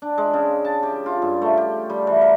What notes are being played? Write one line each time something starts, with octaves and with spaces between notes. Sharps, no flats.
D4
G#3
C#3
A5
G4
F4
G2
A3
G4
G3
E3
A#4